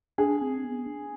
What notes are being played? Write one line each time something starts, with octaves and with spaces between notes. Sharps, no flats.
D4 G#4
C4
B3
D4